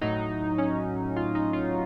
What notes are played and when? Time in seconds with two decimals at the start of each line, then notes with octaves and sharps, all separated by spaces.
0.01 A2 F#3 D#4
0.58 C#4
1.16 F4
1.35 D#4
1.53 F4